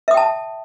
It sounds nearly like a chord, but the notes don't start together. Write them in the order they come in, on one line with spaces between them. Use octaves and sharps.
E5 D#6 G5 A5